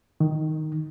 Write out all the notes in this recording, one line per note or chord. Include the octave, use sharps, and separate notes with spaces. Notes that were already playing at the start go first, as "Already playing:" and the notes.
D#3